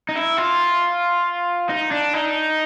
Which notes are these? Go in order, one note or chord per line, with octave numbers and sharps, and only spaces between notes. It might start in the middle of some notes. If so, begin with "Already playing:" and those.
D#4
E4
F4
D#4
D4
D#4